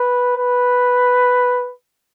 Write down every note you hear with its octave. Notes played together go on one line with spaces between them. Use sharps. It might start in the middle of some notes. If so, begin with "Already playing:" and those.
Already playing: B4
B4